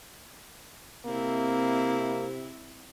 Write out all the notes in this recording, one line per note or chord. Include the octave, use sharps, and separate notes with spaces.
C3 A#3 C4 E4